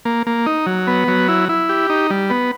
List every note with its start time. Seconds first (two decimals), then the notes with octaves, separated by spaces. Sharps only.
0.05 A#3
0.27 A#3
0.46 D#4
0.66 F#3
0.87 B3
1.08 F#3
1.28 E4
1.49 E4
1.69 G4
1.90 D#4
2.10 G3
2.30 B3